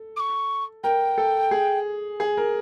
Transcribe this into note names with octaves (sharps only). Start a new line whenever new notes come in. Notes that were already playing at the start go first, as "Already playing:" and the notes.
Already playing: A4
D6
C#6
A#4 G5
A4
G#4
G#4
A#4